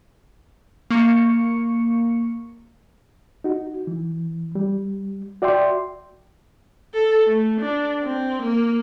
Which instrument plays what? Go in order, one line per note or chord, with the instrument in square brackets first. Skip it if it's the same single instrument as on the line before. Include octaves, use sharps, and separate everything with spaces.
[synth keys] A#3 C#6 C#7
[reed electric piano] D#4 F#4
E3
G3
F#4 D5 E5 G5 C6
[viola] A4
A3
D4
C4
A#3